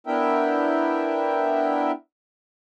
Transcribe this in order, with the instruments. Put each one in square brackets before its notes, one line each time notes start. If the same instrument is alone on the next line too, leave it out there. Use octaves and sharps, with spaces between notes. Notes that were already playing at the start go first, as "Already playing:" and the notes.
[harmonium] B3 D4 E4 A#4 E5 G5